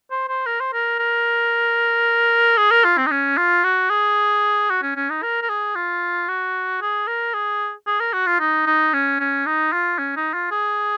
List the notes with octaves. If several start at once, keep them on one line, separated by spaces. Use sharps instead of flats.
C5
C5
A#4
C5
A#4
A#4
G#4
A#4
F4
C4
D#4
C#4
F4
F#4
G#4
F#4
C#4
C#4
D#4
A#4
A#4
G#4
F4
F#4
G#4
A#4
G#4
G#4
A#4
F#4
F4
D#4
D#4
C#4
C#4
D#4
F4
C#4
D#4
F4
G#4